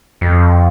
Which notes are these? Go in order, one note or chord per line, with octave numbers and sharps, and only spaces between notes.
F2